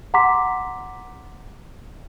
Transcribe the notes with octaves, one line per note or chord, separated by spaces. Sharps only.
F#5 A#5 C6 D6 B6